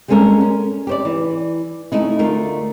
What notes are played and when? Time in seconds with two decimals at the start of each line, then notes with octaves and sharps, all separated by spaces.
0.08 G3 G#3 A#3 C#4 A4 A#4
0.41 C#4
0.87 G4 C5 D5
1.05 E3
1.92 A3 C#4 D#4 E4
2.19 D2 A3 F4 A#4